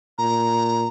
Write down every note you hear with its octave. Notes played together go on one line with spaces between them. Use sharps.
A#2 A#5